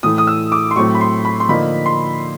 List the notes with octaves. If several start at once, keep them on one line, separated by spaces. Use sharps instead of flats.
A2 E3 A3 D#6
D#6
E6
D6
C6
A2 F#3 A3 C4 C#6
B5
C6
B5
C6
D3 F3 A#3 D#4 B5
C6